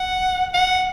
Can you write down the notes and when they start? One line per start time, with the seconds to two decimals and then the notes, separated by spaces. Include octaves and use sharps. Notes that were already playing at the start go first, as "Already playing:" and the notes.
Already playing: F#5
0.54 F#5